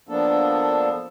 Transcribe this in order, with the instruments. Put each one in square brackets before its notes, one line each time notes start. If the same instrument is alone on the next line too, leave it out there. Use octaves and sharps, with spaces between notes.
[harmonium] F3 A#3 B3 D4 A4